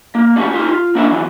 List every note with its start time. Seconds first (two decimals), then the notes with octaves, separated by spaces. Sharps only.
0.15 A#3
0.36 G3 A3 C#4 D#4 F#4 G4
0.54 D#4 F4 G4
0.68 F4
0.95 A#3 C#4 D4 E4 A#4 E5
1.11 E2 E3 F#3